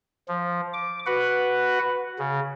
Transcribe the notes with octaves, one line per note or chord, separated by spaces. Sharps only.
F3
D6
F#4 B4 F#5
C#3